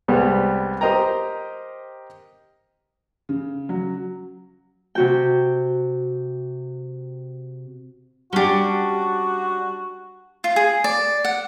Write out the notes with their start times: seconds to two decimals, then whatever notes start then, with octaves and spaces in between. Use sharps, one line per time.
0.08 C2 G3 G#3 B3
0.81 G4 A#4 C5 D#5 G5 A#5
3.29 C#3
3.69 F#3
4.95 C3 F#4 G5
8.33 G3 C#4 D4 F#4 G4
10.44 F4
10.56 G#4
10.84 D5
11.25 F#5